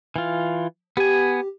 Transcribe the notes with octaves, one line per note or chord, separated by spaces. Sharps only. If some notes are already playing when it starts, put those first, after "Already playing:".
E3 F4
B3 G4 G#5